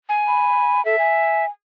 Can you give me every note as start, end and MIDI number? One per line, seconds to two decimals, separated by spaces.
0.09 0.83 80
0.27 0.84 83
0.85 0.96 69
0.85 1.45 76
0.99 1.48 80